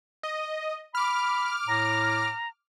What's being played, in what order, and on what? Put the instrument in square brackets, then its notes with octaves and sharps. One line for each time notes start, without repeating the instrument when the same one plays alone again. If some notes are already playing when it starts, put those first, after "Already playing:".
[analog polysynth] D#5
[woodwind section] B5 [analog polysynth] D6 F6
[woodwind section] A2 [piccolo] A#5